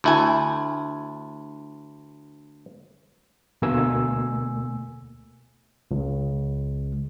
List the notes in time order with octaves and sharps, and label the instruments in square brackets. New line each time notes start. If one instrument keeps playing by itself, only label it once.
[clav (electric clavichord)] D2 E4 G#5
[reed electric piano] D2 B2 A3 A#3 G#5 E6
[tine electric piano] C#2